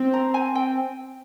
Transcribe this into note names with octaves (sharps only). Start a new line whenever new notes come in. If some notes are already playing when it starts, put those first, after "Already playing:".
Already playing: C4
A#5
G#5
G5